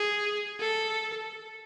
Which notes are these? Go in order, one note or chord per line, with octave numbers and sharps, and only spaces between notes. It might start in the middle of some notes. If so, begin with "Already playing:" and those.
Already playing: G#4
A4